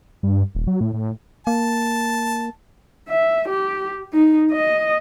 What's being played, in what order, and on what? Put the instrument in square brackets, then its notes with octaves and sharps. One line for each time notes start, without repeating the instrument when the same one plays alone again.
[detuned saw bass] G2
D#1
F#3
A2
A2
[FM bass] A#3 [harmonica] A5
[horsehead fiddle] E5
G4
D#4
D#5